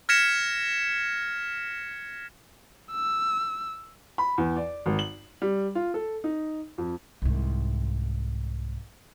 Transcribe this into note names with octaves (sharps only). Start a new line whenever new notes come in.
F6 G#6 A#6 B6 C#7 E7
E6
B5
E2
D5
G#1
F#7
G3
F4
A4
D#4
F2
C2 G#2